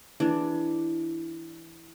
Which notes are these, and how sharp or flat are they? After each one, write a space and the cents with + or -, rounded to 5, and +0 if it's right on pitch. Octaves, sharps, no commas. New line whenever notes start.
E3 +0 D4 +0 G#4 +25